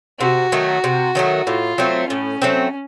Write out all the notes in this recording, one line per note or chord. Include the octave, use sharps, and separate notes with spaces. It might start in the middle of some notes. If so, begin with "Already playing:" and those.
C3 F#4
D#3 F#3 A3
C3
D#3 F#3 A3
A2 F4
F#3 A3 C4
A2 C#4
F#3 A3 C4